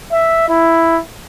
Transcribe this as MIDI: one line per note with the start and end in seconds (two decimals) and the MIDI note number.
0.12 0.49 76
0.49 0.99 64